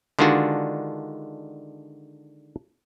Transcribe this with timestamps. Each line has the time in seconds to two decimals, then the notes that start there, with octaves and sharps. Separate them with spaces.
0.19 D3 D#3 G#3 D4 F4 F#4